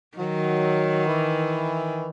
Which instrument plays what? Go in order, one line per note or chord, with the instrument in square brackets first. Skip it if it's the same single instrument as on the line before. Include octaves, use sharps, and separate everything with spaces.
[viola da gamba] D#3 [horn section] F#3
[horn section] E3